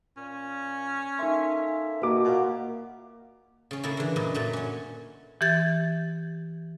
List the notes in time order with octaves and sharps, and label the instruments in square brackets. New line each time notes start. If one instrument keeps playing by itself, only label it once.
[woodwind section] A#2 [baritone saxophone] C#4
[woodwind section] A#3 A4 E5 [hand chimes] D#4 G#5 C6
[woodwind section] B2 [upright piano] A#3 F#4 D6 [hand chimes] A#4
[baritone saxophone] A#2 [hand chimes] F5 F#5
[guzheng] C#3 C#4
C#3 A3 A#3 E4
D3 E3
F#2 A#2 E4 D#5
A#2 F#3 A3
C#4 C#5
[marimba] E3 G4 G#6 A6